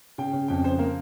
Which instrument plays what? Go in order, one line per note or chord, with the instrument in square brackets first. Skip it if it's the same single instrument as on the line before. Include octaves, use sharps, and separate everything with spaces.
[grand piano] C#3 G5
C#3
F2 G5
C#3 C5
A#3 A#4